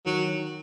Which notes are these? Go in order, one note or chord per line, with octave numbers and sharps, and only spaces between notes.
D#3 F#3